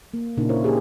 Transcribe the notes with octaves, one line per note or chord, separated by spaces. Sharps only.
A#3
A#2 C#3 A#3 D4 D#4
E4 A#4 C5 C#5
A#3 G4 G#4